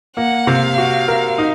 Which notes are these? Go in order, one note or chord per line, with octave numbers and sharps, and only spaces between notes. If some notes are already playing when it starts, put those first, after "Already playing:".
A#3 F#5
C3 F5
F#4
A#4
D#4